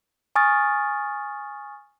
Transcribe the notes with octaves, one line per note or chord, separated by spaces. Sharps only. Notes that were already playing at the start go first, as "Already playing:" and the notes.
G#5 C#6 D#6 F6 A6